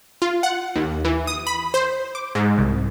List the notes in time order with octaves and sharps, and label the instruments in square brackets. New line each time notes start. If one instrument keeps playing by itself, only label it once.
[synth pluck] F4
F#5
D#2
E3
D#6
B5
C5
D6
G#2
C2